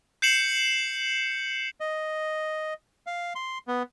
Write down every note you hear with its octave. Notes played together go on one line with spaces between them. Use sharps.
G6 C7 C#7 E7 F#7
D#5
F5
C6
B3